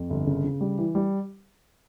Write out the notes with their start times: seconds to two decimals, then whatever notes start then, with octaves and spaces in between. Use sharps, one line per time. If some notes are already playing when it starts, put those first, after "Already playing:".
Already playing: F2
0.10 G1
0.27 C#3
0.44 C#3
0.61 G3
0.78 E3
0.95 G3